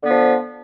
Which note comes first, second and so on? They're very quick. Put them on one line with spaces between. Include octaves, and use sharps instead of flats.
D3 B3 F3